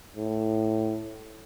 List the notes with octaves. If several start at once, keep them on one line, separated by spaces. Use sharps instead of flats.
A2